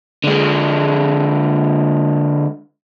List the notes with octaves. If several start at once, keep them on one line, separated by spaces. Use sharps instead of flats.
D3 G#3